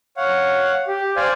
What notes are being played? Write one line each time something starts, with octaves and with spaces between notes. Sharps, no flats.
C#5 F5 F#5
G4
C5 D5 F5 G#5